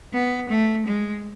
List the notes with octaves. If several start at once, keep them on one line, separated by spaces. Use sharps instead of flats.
B3
A3
G#3